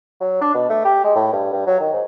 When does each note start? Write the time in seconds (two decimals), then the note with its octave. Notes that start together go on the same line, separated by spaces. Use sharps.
0.20 F#3
0.41 D4
0.55 B2
0.70 A3
0.85 G4
1.04 G#3
1.16 A2
1.32 G2
1.53 G2
1.67 F#3
1.80 D#3
1.93 G#2